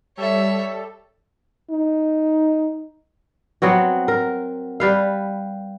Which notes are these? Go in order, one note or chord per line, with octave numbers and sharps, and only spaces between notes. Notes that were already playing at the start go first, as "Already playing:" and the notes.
G3 A4 C#5 E5
D#4
F#3 B3 C4 F#4
A#4
G3 B4 F5